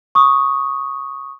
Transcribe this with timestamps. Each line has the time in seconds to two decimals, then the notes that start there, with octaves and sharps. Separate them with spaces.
0.15 C#6 D#6